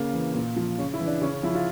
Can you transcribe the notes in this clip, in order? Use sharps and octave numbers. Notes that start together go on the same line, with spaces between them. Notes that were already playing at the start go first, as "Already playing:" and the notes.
Already playing: C#3 A#3
E3
A#2
F3
C#3 C#4
E4
E3
D4
C#3 C#4
C#4
F3 E4
F4